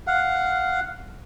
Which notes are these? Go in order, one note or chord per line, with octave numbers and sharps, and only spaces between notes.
F5 F#5